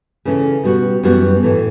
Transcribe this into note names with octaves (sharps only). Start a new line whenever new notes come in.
C#3 E3 A3 C#4
B2 G3 B3 F#4
F#2 E3 G3 B3 F#4
A2 E3 A3